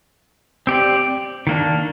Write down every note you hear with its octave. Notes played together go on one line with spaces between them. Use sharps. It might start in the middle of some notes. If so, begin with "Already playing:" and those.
C4 G4 D5
D#3 A#3 D4